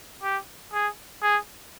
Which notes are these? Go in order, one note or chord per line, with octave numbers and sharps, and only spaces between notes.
G4
G#4
G#4